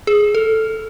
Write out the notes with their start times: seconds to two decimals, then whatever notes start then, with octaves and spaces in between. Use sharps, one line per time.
0.07 G#4
0.35 A4